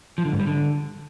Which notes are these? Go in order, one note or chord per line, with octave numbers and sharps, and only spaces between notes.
F3
D3
G#2
G3
D3